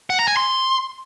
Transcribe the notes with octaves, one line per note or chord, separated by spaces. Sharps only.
F#5
A#5
G#5
C6